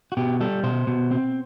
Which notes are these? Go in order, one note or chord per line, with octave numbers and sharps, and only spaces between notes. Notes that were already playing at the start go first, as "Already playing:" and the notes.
F#4
B2 G4
G3 A4
B2 C5
B2
C4